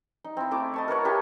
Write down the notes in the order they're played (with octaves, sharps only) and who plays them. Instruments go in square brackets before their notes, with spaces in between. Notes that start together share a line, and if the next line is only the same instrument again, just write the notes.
[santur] D#4
C4 E4
A3 E4 D6
D#5 A5 C#6
A#4 B4 C#5 F#5
E4 G4 A#4 A5